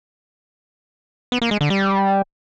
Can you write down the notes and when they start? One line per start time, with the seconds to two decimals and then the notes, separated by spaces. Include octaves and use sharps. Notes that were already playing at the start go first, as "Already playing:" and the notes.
1.32 B3
1.42 A#3
1.51 G#3
1.61 D3
1.70 G3